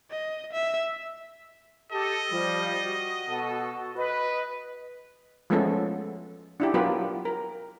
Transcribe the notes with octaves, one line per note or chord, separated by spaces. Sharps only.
D#5
E5
G4 A4 D#5
F3 G3
F#4
B2 A4
B4 D#5
F3 G#3 A3 B3 C#4 A4
D4 E4 G4
F#3 B3 F4 G4 A#4 B4
A#4